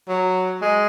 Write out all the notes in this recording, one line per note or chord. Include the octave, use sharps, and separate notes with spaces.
F#3
G#3